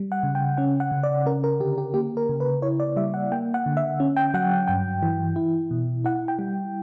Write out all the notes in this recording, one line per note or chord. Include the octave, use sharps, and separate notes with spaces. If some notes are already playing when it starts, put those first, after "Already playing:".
Already playing: G3
F#5
C#3
G5
C#4 F#5
F#5
C#3
D5
C#4 A#4
A#4
D3 G4
G4
A#3 G4
A#4
C#3
B4
E4 C#5
D5
G3 E5
F#5
A#3 G5
F#5
D3
E5
C#4
G5
F#3 F#5
G2 G5
E3
E4
B2
E4 F#5
G5
G3